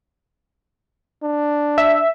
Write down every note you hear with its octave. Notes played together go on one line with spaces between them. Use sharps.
D4
E5